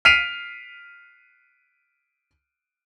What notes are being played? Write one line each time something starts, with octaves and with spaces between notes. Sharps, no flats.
F6 B6 C7 D7 D#7 F7